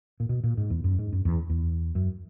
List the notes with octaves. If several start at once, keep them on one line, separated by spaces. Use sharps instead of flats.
A#2
B2
A#2
G#2
E2
F#2
G#2
F#2
E2
E2
F#2